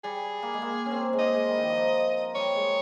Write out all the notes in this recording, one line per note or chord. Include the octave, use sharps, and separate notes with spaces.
G3 G#4
A#3
G#3
A#3
C#4
C4
G#3
A#3 D#5
G#3
G3
D#3
F3
G3 C#5
G#3